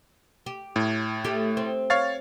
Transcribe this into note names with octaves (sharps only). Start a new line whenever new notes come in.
G4
A2
A3 G4
C4
C#5 F5 A6